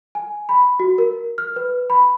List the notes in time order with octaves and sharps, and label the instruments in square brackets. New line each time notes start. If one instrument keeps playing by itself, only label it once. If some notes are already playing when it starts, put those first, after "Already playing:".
[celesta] G#5
B5
F#4
A#4
F6
B4
B5